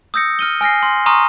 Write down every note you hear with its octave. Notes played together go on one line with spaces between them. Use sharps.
D#6 E6 G6 A#6 C#7
F6 D#7 G7
G#5 F6 A#6 C7
C6
A#5 C6 C#6 D#6 F6 D#7